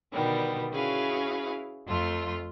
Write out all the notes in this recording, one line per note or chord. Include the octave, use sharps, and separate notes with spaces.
B2 D3 D#3 G3 B3
C#4 E4 F#4 G#4 B4 F5
F2 A3 F4 C6